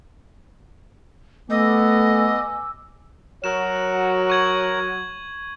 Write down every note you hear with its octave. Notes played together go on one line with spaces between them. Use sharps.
A3 B3 D#5 G#5 D6 E6
F#3 F#4 A#4 C#5 E7
C#6 G#6 F#7